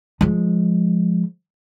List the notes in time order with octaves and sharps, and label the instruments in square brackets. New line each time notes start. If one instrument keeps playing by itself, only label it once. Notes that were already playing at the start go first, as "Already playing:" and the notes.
[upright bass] F3 G#3